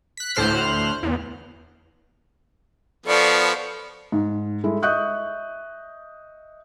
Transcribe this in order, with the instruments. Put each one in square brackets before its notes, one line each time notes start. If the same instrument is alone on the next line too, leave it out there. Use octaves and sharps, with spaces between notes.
[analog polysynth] F#6 B6
D2 A2 C5 F6 F#6
E2
[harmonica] F3 B3 [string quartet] A4 D5 C#6
[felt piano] G#2
G#3 E4 A4
D#5 E5 C#6 D#6 F#6 G6